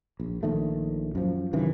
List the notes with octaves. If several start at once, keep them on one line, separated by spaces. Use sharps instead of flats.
A#1
A#1 D#3 A3
F#2 F3
F#2 C3 D#3 E3